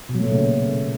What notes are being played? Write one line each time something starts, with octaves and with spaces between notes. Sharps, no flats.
B2
F#3
A3
A#2
C#3